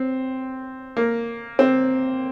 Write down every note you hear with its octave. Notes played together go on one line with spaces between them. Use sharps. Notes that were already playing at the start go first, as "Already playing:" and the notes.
Already playing: C4
A#3
C4